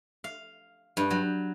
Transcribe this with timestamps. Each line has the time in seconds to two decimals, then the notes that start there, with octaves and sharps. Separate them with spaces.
0.24 F5
0.97 G2
1.10 F#3